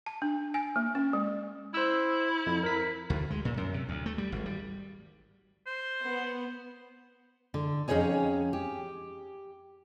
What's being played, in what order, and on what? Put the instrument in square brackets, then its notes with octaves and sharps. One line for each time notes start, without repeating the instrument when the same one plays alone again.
[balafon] A5
D4
G#5
A#3
C#4
G#3
[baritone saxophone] E4 [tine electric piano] C5 E6
[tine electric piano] F2
A#4 B6
[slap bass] D2
G#3
A#2
F#2
C3
D2
A3
G3
G#1
G3
[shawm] C5
[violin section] B3
[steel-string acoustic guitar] D3
F2 C#4 D#4 G#4 C#5 G#5
G4